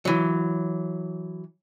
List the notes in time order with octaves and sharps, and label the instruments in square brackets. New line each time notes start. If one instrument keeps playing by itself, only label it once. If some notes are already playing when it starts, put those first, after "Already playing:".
[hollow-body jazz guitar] E3 F#3